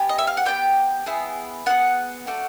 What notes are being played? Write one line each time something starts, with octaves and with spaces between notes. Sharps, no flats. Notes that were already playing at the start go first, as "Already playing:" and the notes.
Already playing: B3 G4 G#5
D#5
E5
F5
F#5
B3 D4 G4 G5
B3 E4 G#4
B3 E4 G#4 F#5
A3 D4 F#4